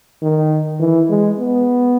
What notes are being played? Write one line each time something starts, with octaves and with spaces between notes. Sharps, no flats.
D#3
E3
G#3
B3